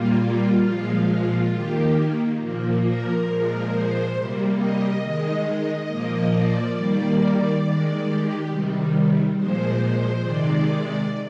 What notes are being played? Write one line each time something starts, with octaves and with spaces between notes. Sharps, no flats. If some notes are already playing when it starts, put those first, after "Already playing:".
Already playing: A#2 G3 A#3 F4
A#2 F3 G#3
D#3 A#3 G4
A#2 F3 A#3
A#4
A#2 F3 G#3
C5
C3 G3 A#3
D#5
D#3 G#3
D#5
A#2 F3 A#3
D5
D#3 G3 A#3
D#3 G#3
G4
C3 D#3 G3
A#2 F3 G#3 C5
C3 D#3 G#3 D5